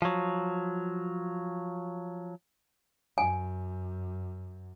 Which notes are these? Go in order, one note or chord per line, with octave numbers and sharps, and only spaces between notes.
F3 F#3
F#2 G#5